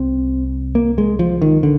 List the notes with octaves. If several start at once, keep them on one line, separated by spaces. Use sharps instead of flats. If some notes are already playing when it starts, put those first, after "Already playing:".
Already playing: C2 C3 C4
A#3
G#3
F3
D#3
D3